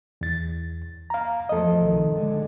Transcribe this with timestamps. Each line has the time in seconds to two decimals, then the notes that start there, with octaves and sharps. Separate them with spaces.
0.21 E2 A6
1.10 F5 A#5
1.49 E2 F3 A3 A4 D#5
1.80 C2 B2 D#3
2.12 A#2 D3 G#3